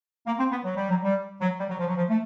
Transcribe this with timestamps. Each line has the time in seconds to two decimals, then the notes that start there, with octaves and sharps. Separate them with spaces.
0.27 A#3
0.39 C4
0.51 B3
0.65 F#3
0.77 G3
0.90 F#3
1.03 G3
1.41 F#3
1.60 G3
1.69 F#3
1.79 F3
1.87 F#3
1.96 F3
2.09 A3